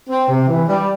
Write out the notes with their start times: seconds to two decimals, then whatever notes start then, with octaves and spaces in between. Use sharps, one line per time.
0.10 C4
0.28 C3
0.48 E3
0.68 G3